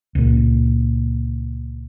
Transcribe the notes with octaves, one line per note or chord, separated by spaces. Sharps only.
C#2 A#2